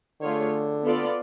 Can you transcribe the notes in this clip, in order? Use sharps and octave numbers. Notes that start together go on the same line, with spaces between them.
D3 A3 F4 G#4 C#5
B3 F4 A4 D5